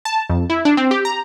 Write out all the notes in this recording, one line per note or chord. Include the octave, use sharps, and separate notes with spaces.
A5
F2
E4
D4
C4
G4
A#5